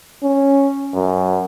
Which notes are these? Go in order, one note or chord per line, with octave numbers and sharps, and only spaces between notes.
C#4
F#2